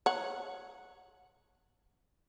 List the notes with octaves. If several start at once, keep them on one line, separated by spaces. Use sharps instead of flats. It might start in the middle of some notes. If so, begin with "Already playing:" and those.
C#5 F#5